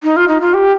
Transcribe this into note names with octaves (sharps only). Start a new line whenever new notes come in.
D#4
F4
D#4
F4
G4